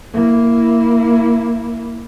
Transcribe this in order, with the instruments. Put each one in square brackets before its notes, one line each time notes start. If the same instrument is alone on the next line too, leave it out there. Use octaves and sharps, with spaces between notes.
[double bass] A#3 E4